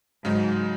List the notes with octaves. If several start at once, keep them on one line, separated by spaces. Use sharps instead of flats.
G#2 C#3 F#3 D#4